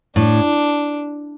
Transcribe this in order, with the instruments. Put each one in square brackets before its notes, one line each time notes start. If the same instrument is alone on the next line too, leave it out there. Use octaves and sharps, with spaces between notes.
[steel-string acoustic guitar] A2 [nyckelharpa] D4